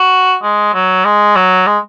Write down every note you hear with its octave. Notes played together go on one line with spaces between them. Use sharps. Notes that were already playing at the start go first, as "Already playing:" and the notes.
Already playing: F#4
G#3
F#3
G#3
F#3
G#3